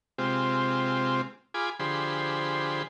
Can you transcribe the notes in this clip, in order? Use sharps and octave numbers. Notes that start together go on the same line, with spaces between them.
C3 G#3 C4 F4 G4
F4 G#4 G#5 B5 D6
D3 F3 G4 G#4 C5 B5